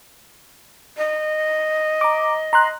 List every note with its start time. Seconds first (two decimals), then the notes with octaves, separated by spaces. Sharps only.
0.98 D#5
2.01 A#5 D6
2.53 A#5 C6 F#6